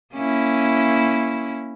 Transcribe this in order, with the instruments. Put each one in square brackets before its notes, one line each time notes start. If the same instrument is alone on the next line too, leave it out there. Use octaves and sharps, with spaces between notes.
[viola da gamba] A#3 C#4 E4